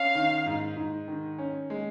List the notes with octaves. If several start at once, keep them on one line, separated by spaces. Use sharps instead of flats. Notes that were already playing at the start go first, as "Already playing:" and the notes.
Already playing: C#4 F5
D#3
G#2
G#2
D#3
C#4
G#3